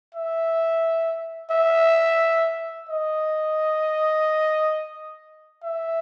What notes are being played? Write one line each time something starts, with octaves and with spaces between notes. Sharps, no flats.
E5
E5
D#5
E5